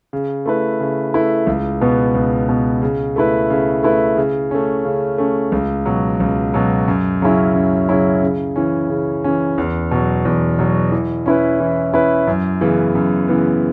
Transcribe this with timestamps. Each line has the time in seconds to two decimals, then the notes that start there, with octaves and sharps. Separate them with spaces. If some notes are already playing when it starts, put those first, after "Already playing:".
0.13 C#3
0.46 A3 E4 B4
0.80 C#3
1.14 A3 E4 B4
1.47 C#2
1.81 B2 B3
2.15 C#2
2.49 B2 B3
2.82 C#3
3.16 A3 E4 B4
3.50 C#3
3.83 A3 E4 B4
4.17 C#3
4.51 A3 C#4
4.85 C#3
5.18 A3 C#4
5.52 C#2
5.86 B2 F#3
6.20 C#2
6.54 B2 F#3
6.88 F#2
7.22 C#3 F#3 C#4 E4
7.55 F#2
7.89 C#3 F#3 C#4 E4
8.23 C#3
8.56 E3 C#4
8.90 C#3
9.24 E3 C#4
9.58 E2
9.91 B2 F#3
10.25 E2
10.59 B2 F#3
10.92 E3
11.26 C#4 E4 B4
11.60 E3
11.94 C#4 E4 B4
12.27 F#2
12.61 C#3 E3 B3
12.95 F#2
13.29 C#3 E3 B3